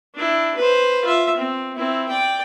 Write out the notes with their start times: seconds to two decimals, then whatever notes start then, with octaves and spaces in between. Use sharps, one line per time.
0.15 D4 E4
0.57 B4 C5
1.05 F4 E5
1.37 C4
1.76 C4 E4
2.09 D5 G5